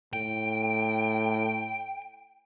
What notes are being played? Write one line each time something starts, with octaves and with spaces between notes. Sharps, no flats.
A2 G5